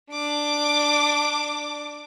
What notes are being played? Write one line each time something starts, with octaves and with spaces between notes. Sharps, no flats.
D4 D6